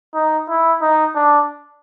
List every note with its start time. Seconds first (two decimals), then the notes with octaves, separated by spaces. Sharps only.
0.14 D#4
0.49 E4
0.82 D#4
1.15 D4